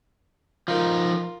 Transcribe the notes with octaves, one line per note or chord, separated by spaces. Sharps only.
F3 D#4 F4 A#4